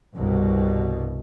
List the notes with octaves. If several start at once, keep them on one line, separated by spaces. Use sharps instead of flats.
C2 G2 B2